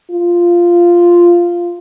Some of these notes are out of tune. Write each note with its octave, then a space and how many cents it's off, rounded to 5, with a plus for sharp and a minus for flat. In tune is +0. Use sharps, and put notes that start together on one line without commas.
F4 -5